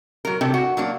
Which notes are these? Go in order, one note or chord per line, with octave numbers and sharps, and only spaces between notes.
F#3 A#4
C3 D4 G4 A4
F#4
F#3 A#3 D4